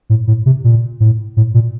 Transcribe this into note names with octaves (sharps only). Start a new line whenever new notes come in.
A2
A2
C3
A#2
A2
A2
A#2